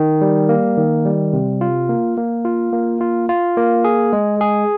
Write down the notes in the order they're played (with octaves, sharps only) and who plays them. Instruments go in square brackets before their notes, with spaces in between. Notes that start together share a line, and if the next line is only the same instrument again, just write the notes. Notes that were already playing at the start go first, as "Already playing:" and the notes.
Already playing: [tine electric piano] D#3
G3
A#3
D#3
G3
C3
F4
A#3
A#3
F4
A#3
F4
F4
A#3
G#4
G#3
G#4